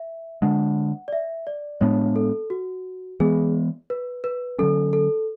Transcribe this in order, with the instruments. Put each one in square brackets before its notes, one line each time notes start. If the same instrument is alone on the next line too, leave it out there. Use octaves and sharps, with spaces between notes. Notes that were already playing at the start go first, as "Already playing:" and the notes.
Already playing: [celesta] E5
[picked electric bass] D3 G#3 D4 [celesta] F#5
[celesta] D5
E5
D5
[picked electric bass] A2 G#3 B3 D4 [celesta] C#5
[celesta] A4
F#4
[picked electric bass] E3 G#3 B3 [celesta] G#4
[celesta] B4
B4
[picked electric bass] D3 F#3 C#4 [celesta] A4
[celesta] A4